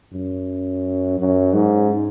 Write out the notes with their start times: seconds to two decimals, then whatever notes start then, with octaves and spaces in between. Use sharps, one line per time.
0.13 F#2
1.18 F#2
1.53 G#2